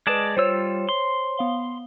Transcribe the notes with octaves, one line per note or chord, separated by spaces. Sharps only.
G#3 B4 D5 A5 D7
G3 F4 C5 C#5 E6
C6
B3 F5 G7